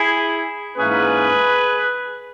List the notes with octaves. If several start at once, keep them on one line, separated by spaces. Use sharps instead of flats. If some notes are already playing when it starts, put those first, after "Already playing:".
Already playing: E4 G#4
G#2 E3 A#3 C#4 G#4 B4